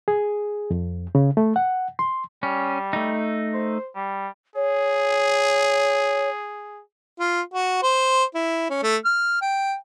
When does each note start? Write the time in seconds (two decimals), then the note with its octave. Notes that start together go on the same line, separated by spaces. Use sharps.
0.08 G#4
0.71 F2
1.15 C#3
1.37 A3
1.56 F#5
1.99 C6
2.43 G3 C#4
2.93 A3 D#4
3.54 C5
3.95 G3
4.56 G#4 C#5
7.19 F4
7.53 F#4
7.82 C5
8.35 E4
8.70 C#4
8.83 A3
9.05 F6
9.42 G5